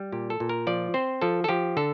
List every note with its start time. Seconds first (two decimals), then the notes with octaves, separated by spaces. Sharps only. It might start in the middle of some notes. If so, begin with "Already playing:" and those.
Already playing: G3
0.12 A#2 G4
0.30 A4
0.40 A#2
0.49 A#4
0.67 F3 D5
0.94 C4 C5
1.22 F3 A4
1.44 A4
1.49 F3 G4
1.77 D3 A4